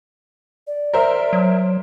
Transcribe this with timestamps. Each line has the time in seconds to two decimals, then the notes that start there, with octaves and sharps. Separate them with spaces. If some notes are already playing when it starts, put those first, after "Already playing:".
0.67 D5
0.93 A#4 C5 E5
1.33 F#3